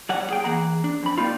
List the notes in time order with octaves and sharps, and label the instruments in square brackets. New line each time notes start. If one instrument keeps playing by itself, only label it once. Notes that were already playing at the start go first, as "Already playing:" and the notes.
[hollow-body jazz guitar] G3 C#5 F#5
G#4 G5
E3 A#3 G#4 F#5 A#5
D4
F2 B5
G3 A#3 D4 D#4 F4